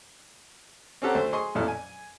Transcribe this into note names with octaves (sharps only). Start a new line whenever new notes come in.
C4 C#4 G4 A4 F#5 A#5
D2 A3 C5
G#4 D#5 C6 C#6 D#6
A1 F2 A#2 E4 A4 F6
G#5